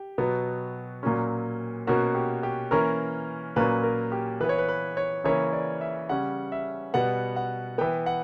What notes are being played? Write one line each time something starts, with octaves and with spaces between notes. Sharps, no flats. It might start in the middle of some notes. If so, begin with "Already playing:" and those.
Already playing: G4
B2 F#3 B3
A#2 F#3 A#3 C#4
B2 A#3 C#4 F#4
G4
G4
E3 A#3 C#4 A#4
A#2 F#3 A#3 C#4 B4
A#4
G4
E3 B3 B4
C#5
B4
B4
C#5
C#3 E3 A#3 C#4 C#5
D5
E5
C#3 G3 C#4 F#5
E5
B2 G3 B3 F#5
F#5
E3 B3 G5
F#5